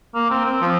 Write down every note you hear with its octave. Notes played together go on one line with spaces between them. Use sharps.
A#3
C4
C4
F3